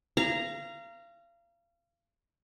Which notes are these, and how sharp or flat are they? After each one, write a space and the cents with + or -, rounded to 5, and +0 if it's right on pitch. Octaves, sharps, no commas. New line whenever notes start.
F5 -30 A#5 -5